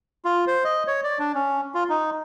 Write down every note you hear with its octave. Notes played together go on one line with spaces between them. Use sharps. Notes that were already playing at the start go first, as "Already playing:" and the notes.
F4
C5
D#5
C#5
D5
D4
C#4
F4
D#4